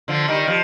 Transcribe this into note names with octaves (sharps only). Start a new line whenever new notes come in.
D3 F3
D#3 G3
F3